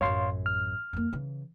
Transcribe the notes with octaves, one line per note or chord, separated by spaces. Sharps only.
A1 F#2 C#5 F5 C6
F6
F2 A#3
C#3 E3